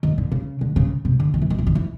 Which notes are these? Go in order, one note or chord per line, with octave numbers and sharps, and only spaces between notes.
D#3
D3
C#3
D3
C#3
C3
D3
D#3
E3
D#3
E3
D#3
E3